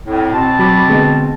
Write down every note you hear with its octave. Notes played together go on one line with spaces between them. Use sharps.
F2 A2
B2 C4 A5
F#3 B5 D6
D3 G#3 B3